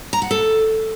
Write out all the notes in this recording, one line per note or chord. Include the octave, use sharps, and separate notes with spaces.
A#5
F#5
A4